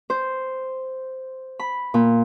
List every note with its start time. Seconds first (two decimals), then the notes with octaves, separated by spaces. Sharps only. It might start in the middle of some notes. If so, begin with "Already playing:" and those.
0.10 C5
1.59 B5
1.94 A#2